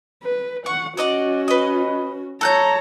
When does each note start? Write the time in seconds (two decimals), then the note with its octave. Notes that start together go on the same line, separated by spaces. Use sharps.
0.23 B4
0.66 F#5 C#6
0.97 C#4 F#4 D5 D#5 F#5
1.48 B4 D#5
2.41 A4 C#5 A#5 F#6 G6